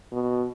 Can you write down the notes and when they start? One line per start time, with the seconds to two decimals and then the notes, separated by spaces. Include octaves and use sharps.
0.12 B2